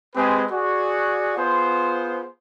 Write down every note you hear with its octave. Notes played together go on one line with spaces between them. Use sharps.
G#3 C4 G4 G#4 B4 D#5
F#4 G#4 D5
B3 F4 G#4 C5